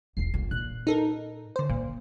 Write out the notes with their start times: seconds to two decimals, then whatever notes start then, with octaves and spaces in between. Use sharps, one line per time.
0.17 E1 E2 C7
0.34 G1 F2
0.51 A#2 F#6
0.87 D#4 A4 A#4
1.56 D3 C5
1.70 A#2 A#3